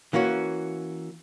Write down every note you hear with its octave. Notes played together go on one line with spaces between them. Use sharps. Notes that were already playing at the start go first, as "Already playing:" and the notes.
E3 A#3 C#4 F#4